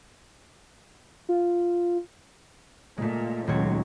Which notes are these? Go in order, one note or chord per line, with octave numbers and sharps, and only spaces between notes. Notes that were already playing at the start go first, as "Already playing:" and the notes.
F4
A#2 G#3 A3
D#1 C#2 F#3 C4 C#5